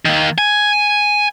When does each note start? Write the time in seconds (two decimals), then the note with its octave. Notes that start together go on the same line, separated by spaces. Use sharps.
0.05 D#3 A#3
0.38 G#5